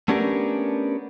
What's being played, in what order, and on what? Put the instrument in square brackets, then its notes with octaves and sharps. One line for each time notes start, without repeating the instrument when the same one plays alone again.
[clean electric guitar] A3 B3 C#4 D4 G4 A#4